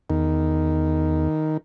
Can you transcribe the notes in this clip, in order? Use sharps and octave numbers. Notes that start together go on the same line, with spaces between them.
E2 D#3